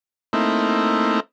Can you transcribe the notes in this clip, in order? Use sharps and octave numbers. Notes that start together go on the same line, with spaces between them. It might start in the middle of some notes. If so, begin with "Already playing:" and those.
A3 A#3 C4 D#4 E4